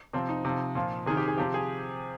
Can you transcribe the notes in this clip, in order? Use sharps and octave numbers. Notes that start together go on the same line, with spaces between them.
C3 F3 C4
D#4
C3 F3
A#2 F3
C3 D#3 G#4
G4
G#4
C3 F3 G4
G#4